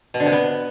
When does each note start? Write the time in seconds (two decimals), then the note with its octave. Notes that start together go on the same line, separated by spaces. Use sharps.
0.14 B2
0.20 D3
0.26 C3
0.32 B3